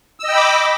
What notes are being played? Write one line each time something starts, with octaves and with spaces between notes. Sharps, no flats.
D#5 G5 B5 D6 E6